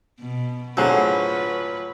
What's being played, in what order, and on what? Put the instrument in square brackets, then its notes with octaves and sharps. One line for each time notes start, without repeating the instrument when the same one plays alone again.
[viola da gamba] B2
[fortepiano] A2 D3 [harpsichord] F#3 [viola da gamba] F4 F#4 B4 [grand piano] G#4 C5